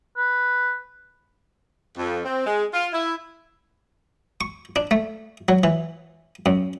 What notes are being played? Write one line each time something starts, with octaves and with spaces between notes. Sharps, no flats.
B4
F2
C4
G#3
F4
E4
C#6
D4
A3
F#3
E3
F#2